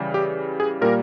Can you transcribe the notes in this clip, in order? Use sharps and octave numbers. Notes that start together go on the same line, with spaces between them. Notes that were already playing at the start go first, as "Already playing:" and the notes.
Already playing: C#3 E3 G3
G4
G#4
A#2 G3 A#3 A#4